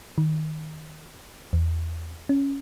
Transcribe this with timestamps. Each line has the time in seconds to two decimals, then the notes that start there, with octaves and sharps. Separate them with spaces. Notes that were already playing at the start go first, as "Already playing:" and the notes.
0.18 D#3
1.53 E2
2.29 C#4